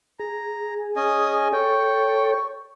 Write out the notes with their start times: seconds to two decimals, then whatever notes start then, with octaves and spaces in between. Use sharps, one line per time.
0.19 G#4 A#5
0.96 C#4 D#5 G#5 D#6
1.53 A4 C#5 G5 C#6